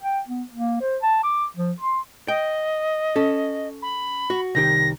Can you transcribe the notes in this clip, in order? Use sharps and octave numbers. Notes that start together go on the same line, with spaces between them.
G5
B3
A#3
C5
A5
D6
F3
C6
D#5 G5
C#4 A4
B5
F#4
C2 D#3 G4 A#6